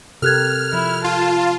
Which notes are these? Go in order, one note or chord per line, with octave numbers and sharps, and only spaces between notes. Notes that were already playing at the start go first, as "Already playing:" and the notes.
C3 G4 A4 A#4 F6 F#6 G#6
F3 E4
F4 A5